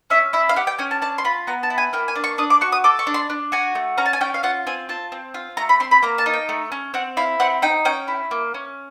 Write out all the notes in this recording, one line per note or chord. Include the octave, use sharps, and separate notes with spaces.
C#4 E5
E4 E5
F5
G4 F#5
G5
C#4 G#5
A5
D4 A5
C6
F4 B5
B3 A#5
A5
E4
G#5
A#3 G5
G#5
D4
C#6
D4 D#6
D6
F#4 C#6
D#6
A4 D6
C#6
D4
C6
D4
F#4 G#5
A3
C#4 A#5
A5
G#5
C#4 G5
F5
F4 F#5
C4 G#5
F4 A5
C4
F4
A3 A#5
B5
C4 C6
B5
A#3 A#5
A5
D#4
G5
A3
C#4
C4 F#5
E4 F5
C4 F#5
D#4 G5
C#4 G5
E4
A#3
C#4